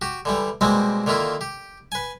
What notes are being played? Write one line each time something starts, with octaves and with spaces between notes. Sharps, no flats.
F#4 G4
D3 E3 G3
B2 G3 G#3 A#3 C4
D3 D#3 A#3 E4 F4
G4
B4 G#5